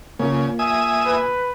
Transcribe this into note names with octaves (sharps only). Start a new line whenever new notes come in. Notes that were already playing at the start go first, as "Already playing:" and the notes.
C#3 A#3 F4
E5 G#5 D#6
B4